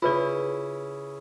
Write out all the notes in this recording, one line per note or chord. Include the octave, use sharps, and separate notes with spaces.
C#3 E4 F4 B4 D5